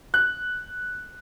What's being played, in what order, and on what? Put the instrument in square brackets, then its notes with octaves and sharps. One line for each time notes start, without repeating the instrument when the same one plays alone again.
[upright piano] F#6